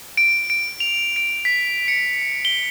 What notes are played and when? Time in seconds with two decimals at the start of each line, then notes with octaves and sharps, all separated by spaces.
0.17 D7
0.50 D7
0.80 F7
1.16 D7
1.45 B6
1.88 C#7
2.45 G7